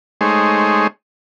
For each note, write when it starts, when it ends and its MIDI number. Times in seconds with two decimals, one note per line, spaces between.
0.21 0.87 56
0.21 0.87 57
0.21 0.87 63
0.21 0.87 68
0.21 0.87 72
0.21 0.87 73